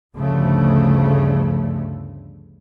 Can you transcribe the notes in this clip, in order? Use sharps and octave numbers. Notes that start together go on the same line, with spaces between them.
G1 D2 G2 C#3 F3 A3